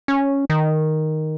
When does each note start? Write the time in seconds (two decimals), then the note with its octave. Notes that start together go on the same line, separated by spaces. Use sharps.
0.08 C#4
0.50 D#3